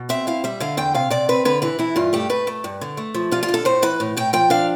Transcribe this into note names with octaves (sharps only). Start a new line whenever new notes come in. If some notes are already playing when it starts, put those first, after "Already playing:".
Already playing: B2
C4 E5
E4 F5
G3 E5
D3 F5
E2 G5
C3 F5
C3 D5
C4 B4
D3 B4
E3 B4
E3 E4
G2 F4
A3 G4
A3 B4
A3
G2
D3
A3
F3
G3 F4
F4
D3
A4
A2 C5
E3 B4
A2
A2 G5
F3 G5
D4 F5